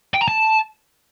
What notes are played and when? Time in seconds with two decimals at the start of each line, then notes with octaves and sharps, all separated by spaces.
0.14 G5
0.21 A#5
0.28 A5